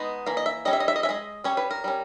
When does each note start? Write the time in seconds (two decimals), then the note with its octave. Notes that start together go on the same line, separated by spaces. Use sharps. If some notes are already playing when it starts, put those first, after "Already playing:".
Already playing: G#3 B3 D#4
0.27 E3 A#3
0.37 D#5
0.46 E5
0.65 G3 C#4 D#5
0.73 E5
0.80 D#5
0.88 E5
0.96 D#5
1.03 C#4 E5
1.09 G#3 D#5
1.44 G3 C#4 C#5
1.57 B4
1.71 A#4
1.84 G3 C#4